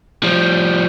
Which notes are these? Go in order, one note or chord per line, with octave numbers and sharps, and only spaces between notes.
F3 G3